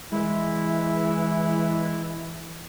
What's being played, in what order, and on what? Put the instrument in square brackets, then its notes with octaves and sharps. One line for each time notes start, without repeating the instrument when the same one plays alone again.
[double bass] E3 [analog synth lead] G#3 [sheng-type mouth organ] E4